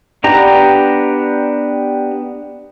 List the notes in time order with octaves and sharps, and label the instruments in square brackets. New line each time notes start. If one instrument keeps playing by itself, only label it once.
[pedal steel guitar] B3 D4 G4 A#5